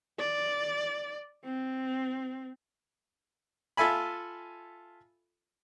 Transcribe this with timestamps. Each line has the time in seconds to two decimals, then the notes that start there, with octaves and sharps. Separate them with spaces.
0.19 D5
1.45 C4
3.77 F4 A4 E5 G#5 B5